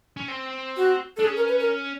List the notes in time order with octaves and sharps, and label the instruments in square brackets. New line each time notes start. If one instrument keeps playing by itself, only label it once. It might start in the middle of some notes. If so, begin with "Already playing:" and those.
[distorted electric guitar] C#4
C4
[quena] F#4
[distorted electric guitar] D4 [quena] A4
[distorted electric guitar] C#4 [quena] G#4
[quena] A#4
B4
A#4